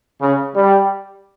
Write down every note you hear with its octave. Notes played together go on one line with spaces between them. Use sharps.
C#3
G3